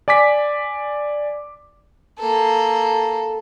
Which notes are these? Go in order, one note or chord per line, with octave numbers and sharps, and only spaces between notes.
D5 G#5 D6 B6
A#3 A4